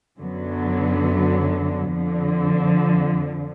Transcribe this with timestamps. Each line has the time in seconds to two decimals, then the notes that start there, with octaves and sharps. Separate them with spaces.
0.18 F#2 D3 F#3 B3
1.91 F2 D3 F3